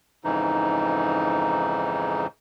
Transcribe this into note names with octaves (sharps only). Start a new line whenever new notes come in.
F2 G#2 C#3 E3 D#4